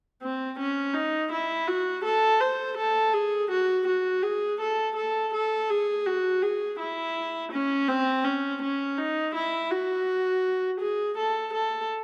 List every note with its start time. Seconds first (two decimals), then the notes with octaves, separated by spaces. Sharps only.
0.22 C4
0.59 C#4
0.94 D#4
1.32 E4
1.68 F#4
2.05 A4
2.41 C5
2.77 A4
3.13 G#4
3.51 F#4
3.87 F#4
4.23 G#4
4.61 A4
4.96 A4
5.34 A4
5.70 G#4
6.06 F#4
6.42 G#4
6.79 E4
7.52 C#4
7.88 C4
8.25 C#4
8.62 C#4
8.98 D#4
9.35 E4
9.71 F#4
10.80 G#4
11.18 A4
11.53 A4